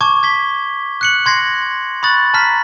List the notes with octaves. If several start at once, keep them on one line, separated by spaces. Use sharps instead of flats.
A5 C#6 D6 G#6
G#6 B6 G7
F#6 C#7 F#7
C6 G#6 A#6 C7
B5 C#6 D#6 F#6 A6 F#7
A5 A#5 F6 B6